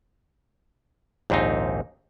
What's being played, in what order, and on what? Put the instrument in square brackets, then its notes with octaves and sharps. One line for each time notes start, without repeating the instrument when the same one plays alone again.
[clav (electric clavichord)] A#1 D#2 G#2 C4 D#4